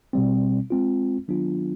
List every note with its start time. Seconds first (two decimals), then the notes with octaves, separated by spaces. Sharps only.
0.13 B2 G3 C4
0.70 G#3 C4 F4
1.28 D#3 F#3 B3 D4 F4